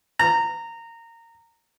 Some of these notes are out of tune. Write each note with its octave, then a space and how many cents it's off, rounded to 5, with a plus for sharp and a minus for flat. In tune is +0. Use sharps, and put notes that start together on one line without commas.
A#5 -20